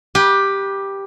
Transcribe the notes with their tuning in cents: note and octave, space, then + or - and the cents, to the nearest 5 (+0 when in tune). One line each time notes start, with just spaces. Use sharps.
G4 +5 B4 -25